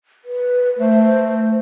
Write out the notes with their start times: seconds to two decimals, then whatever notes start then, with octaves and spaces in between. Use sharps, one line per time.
0.25 B4
0.79 A3 C5